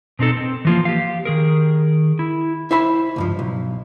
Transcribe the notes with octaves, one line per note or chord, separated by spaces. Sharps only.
B2 C4 D#4 A4
C4
E3 F3 A#3
G4 F5
D#3 G#4 A#4
E4
E4 C5 E5 B5
C#2 G2 F3
B1